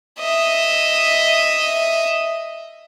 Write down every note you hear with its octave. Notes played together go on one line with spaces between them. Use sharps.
D#5 E5